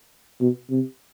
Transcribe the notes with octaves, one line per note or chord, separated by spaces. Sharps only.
B2
C3